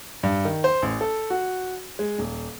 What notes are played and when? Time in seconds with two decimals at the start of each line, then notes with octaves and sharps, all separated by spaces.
0.23 G2
0.45 D#3
0.64 C5
0.82 A1
1.01 A4
1.30 F#4
1.99 G#3
2.19 D#1